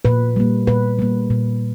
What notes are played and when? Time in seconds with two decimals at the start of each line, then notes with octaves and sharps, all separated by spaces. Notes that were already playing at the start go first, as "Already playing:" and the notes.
0.05 A#2 B4
0.36 G3 A#3
0.67 A#2 B4
0.99 G3 A#3
1.30 A#2